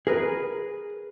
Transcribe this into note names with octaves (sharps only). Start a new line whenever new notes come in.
G#4 A#4 B4